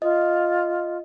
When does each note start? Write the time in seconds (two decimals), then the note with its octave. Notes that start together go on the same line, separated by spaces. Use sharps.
0.02 F4 D#5